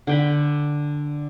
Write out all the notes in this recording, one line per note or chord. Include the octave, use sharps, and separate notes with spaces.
D3 G5 B5